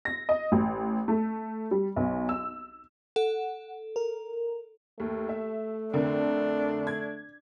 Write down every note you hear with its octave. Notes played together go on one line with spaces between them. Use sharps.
A#6
D#5
A1
A3
G3
B1
E6
A4 F#5
A#4
D#2 A3
E5
F2 D3 D4 A#4
G#6